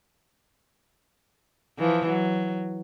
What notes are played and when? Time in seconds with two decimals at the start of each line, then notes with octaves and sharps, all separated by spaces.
1.79 E3 F3
2.08 F#3